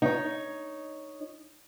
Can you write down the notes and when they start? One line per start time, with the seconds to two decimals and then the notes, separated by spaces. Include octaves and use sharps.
0.02 D#4 C#5